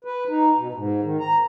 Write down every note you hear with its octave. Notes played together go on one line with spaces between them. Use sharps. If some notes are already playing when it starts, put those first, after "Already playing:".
B4
D#4
B2
G#2
D#3
A#5